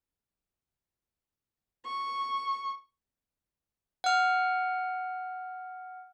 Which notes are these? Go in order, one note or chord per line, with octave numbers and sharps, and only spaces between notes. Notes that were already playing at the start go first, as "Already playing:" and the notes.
C#6
F#5 F6